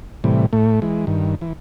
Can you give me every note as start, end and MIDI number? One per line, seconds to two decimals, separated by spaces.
0.24 0.46 45
0.24 0.46 48
0.24 0.46 52
0.24 0.46 55
0.53 0.80 45
0.53 0.80 57
0.82 1.05 52
0.82 1.05 56
1.07 1.35 43
1.07 1.35 51
1.41 1.53 52